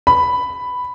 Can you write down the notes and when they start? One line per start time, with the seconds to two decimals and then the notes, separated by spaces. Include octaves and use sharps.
0.07 B5